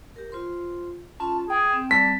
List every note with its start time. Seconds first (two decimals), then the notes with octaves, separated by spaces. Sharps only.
0.16 G4 A#4
0.32 F4 C5 C6
1.20 C#4 F4 A5 C6
1.50 G#4 G5 D#6
1.73 C4
1.91 G3 A5 B6